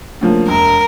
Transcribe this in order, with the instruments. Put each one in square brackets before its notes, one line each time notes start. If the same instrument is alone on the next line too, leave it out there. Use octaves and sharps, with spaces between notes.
[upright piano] D2 C#3 F3 A#3
[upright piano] E1 [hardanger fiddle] A#4